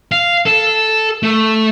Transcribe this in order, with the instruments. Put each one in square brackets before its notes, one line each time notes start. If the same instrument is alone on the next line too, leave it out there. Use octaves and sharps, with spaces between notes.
[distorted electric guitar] F5
A4
A3